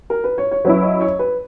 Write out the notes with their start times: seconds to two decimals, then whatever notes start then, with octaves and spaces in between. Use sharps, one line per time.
0.10 A#4
0.24 B4
0.38 C#5
0.51 C#5
0.65 F#3 C#4 E4 B4
0.83 D#5
1.01 C#5
1.19 B4